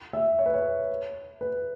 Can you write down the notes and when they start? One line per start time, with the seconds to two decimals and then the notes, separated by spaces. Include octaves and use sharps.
0.13 E5
0.39 C#5
0.46 B4
0.54 C#5
1.41 B4